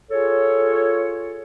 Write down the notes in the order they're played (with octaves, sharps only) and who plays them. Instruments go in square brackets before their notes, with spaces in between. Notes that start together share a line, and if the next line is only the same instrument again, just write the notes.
[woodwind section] F4 G#4 A4 C#5